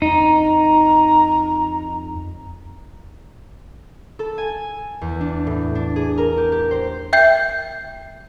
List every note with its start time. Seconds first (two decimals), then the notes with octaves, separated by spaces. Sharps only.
0.02 F2 D#4 A#5
4.19 A4
4.38 G#5
5.01 E2
5.20 D4
5.47 A2
5.75 D4
5.96 G#4
6.18 A#4
6.37 G4
6.52 G4
6.71 C5
7.13 E5 G5 G6 C7